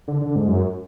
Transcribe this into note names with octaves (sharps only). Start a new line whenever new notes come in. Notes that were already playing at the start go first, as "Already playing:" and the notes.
D3
D3
G#2
F#2